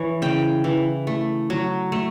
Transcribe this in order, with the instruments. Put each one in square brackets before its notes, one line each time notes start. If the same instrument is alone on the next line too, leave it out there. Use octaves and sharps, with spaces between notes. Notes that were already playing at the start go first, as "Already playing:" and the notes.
Already playing: [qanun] E3 C#5
C#3 G5
E3
A3
F#3
A3